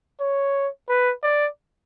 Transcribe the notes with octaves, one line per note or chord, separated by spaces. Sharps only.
C#5
B4
D5